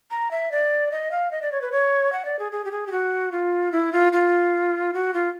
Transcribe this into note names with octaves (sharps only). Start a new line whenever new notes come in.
A#5
E5
D5
D#5
F5
D#5
D5
C#5
B4
C#5
F#5
D5
G#4
G#4
G4
G#4
G4
F#4
F4
E4
F4
F4
F#4
F4